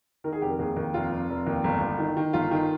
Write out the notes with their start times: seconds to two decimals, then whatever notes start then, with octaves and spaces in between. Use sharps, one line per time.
0.24 D#3 A#4
0.32 G#4
0.42 F1 G4
0.50 A#4
0.59 D#2 G#4
0.77 D#2
0.94 F1 F4
1.11 F1
1.30 F1
1.47 D#2
1.64 G1
1.81 G1
1.98 D#3
2.17 D#3
2.33 G1 F4
2.51 D#3